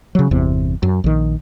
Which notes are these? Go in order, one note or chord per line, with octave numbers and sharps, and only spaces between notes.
C#3 F#3
G1 E2 C3
F#2
A#1 D#3